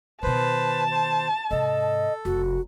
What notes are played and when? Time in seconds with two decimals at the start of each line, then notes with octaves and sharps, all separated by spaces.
0.23 B2 D#3 B4 C5 A5
0.91 C5
1.51 G#2 C3 A4 D#5
2.25 F1 F#4